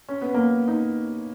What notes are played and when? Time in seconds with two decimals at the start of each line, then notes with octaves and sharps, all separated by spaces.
0.08 C#4
0.21 B3
0.34 A#3
0.68 D#4